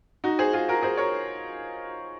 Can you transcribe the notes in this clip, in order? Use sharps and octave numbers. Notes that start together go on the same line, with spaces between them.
D#4 F#4
G#4 C5
F4 G#4
F#4 A#4
G#4 C5
A#4 C#5